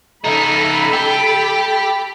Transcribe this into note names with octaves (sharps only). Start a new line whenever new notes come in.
C#3 D#4 A4 B5
G4